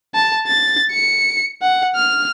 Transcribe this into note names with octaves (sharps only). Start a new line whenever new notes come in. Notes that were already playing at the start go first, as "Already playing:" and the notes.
A5
A6
C#7
F#5
F6